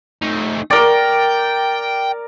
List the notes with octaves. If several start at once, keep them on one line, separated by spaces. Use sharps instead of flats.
A3 D#4
A#4 D5 G5